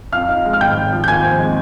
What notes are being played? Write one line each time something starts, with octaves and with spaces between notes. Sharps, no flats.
F2 F5 F6
D#4
G#3
F6
G#1 G5 G6
G#1
F3
G6
D#2 G#5 G#6
C4
G#3